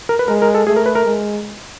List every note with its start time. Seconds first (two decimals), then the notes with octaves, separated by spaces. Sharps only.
0.09 A#4
0.19 B4
0.28 G#3 A#4
0.42 A#4
0.55 A4
0.67 A3 G#4
0.76 A#4
0.86 B4
0.95 A#4
1.05 G#3